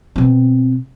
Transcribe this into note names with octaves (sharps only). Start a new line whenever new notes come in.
B2 C4